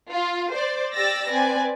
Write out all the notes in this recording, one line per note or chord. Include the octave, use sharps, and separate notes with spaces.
F4
C5 D5
G4 D5 E6 A6 A#6
C4 B4 D5 G#5